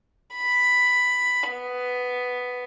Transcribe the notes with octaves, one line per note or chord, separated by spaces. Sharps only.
B5
B3